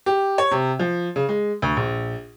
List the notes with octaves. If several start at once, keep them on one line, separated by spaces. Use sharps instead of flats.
G4
C#5
C3
F3
C#3
G#3
D2
A#1